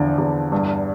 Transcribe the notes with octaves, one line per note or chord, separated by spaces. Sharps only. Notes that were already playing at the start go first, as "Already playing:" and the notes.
Already playing: E2 D3 F3
E2
G2